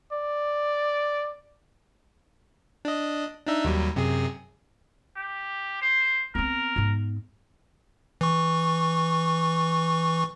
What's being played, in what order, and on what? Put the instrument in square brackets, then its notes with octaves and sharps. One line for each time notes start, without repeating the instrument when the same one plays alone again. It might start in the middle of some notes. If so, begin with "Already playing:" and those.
[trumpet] D5
[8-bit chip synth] D4 D#5
D4 D#4 E5
D#2 F#3 G3
F#2 C3 G#4
[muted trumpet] G4
C5
[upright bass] B3 C4 [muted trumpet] A#4
[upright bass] G#2 B3
[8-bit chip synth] E3 C#6